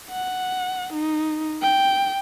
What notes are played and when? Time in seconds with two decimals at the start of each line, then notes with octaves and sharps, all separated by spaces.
0.10 F#5
0.93 D#4
1.62 G5